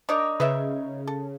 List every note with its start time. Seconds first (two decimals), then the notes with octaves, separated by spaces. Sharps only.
0.09 D4 D#4 A#4 C#5 D5
0.40 C#3 B4 D#5 E5
1.07 A4